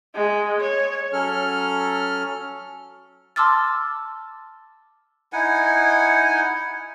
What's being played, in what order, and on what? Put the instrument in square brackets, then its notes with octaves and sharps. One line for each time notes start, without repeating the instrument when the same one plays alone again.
[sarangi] G#3
C#5
[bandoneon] F#3 C#4 A4 F6
[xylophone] A5 C6 D6 E6 F6 A6
[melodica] D#4 E4 F#5 G#5